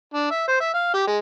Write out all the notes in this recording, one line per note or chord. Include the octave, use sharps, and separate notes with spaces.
D4
E5
C5
E5
F5
G4
G#3